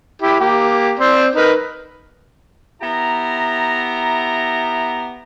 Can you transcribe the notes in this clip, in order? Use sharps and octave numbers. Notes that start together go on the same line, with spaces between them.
E4 G4
A#3 G4
C4 C5 D5
D#4 A#4 B4
B3 E4 G4 A#5